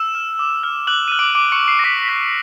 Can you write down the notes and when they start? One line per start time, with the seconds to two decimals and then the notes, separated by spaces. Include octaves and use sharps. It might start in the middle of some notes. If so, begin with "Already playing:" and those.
Already playing: E6 E7
0.15 F6
0.39 D6
0.63 F6
0.87 D6 F#6 F#7
1.08 F6 D#7
1.19 D6 D7
1.35 D6 D7
1.52 C#6 C#7
1.60 F#6
1.68 C7
1.79 A#6
1.84 D6 B6
2.09 F#6 B6